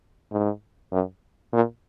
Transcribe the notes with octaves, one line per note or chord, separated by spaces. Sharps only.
G#2
F#2
A#2